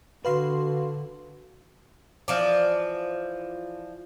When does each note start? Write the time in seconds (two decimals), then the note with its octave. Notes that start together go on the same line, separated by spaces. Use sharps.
0.25 D3 F#4 B4 F5 C6
2.28 E3 F3 D5